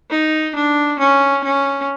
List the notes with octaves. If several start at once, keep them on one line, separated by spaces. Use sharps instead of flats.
D#4
D4
C#4
C#4